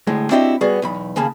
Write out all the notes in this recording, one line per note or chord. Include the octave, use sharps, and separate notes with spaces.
D2 A2 G#3
C4 D4 E4 F#4 G4 D#5
G3 B3 F#4 G#4 D5
B1 E2 B5
D#2 C#3 A#3 G#4 A5 B5